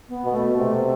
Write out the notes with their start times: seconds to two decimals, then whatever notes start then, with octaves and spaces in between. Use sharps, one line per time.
0.09 B3
0.25 B2
0.32 A3
0.56 C3 A3